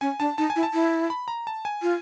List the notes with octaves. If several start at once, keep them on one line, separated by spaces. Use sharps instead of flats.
C#4 G#5
D4 A5
D#4 A5
G#5
E4
A5
E4
B5
A#5
A5
G#5
F4